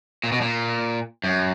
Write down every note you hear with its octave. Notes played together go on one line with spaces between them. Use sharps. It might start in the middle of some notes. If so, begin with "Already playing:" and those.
A#2
B2
A#2
F#2